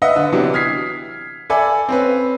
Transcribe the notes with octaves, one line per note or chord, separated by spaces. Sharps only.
B4 D#5 E5 F#5
D3 B4
C3 E3 F#3 B3 D4
D#6 F6 G#6 B6 C7
A4 D5 E5 G#5 B5
C4 C#4 B4